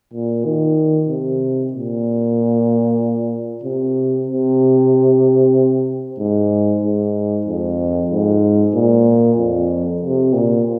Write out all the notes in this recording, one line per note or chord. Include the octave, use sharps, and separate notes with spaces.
A#2
D#3
C3
A#2
C3
C3
G#2
G#2
F2
G#2
A#2
F2
C3
A#2